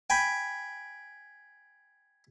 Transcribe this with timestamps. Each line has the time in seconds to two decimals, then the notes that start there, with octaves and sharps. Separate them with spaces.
0.10 G5 G#5 B5